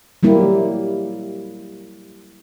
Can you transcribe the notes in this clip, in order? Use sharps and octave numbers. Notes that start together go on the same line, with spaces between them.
F#3 G3 A#3 E4 G4